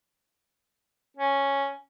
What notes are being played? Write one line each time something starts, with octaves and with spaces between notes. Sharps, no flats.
C#4